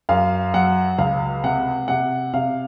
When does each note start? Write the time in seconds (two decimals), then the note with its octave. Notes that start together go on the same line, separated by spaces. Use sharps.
0.09 F#2 F5
0.54 F#3 F#5
0.98 C#2 F5
1.44 C3 F#5
1.88 C3 F#5
2.34 C3 F5